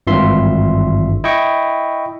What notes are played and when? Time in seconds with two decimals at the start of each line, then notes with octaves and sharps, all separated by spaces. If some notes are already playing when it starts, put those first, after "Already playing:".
0.07 G#1 G2 E3 F4 E5 C6
1.24 E4 D#5 G5 C#6